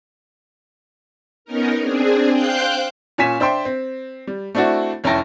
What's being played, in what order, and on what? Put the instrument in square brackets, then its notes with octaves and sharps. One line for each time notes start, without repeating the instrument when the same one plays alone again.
[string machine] B3 C#4 D#4 A#4
C4 D4 G#4
C5 F5 G5 F#6 G6
[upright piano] A#2 C#4 G#5 B6 E7
D4 C5 E5 G5 C6
C4
G3
A3 C4 D4 E4 F#4
F1 C#4 E4 G5 A5 A#6